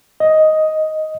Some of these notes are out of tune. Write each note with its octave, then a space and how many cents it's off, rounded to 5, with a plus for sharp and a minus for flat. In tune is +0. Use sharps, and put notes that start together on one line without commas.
D#5 +5